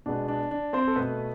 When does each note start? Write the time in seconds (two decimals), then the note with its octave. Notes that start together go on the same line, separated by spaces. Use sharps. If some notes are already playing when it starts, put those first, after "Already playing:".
0.06 B2 G#3 B3 D4
0.28 D4
0.51 D4
0.73 C4 C5
0.87 A4
0.96 B2 A3 B3 B4